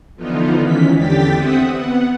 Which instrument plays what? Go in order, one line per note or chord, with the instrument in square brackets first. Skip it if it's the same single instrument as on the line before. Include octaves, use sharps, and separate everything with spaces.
[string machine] D3 E3 F3 B3 D#4 F4
D#3 E3 G#3 C#4 B6
E2 D3 G4 G5 A6 B6
C4 E5 F#5 D#6
B3 F#5